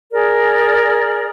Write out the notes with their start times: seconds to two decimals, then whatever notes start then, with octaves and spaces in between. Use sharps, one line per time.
0.12 G#4 A#4 D5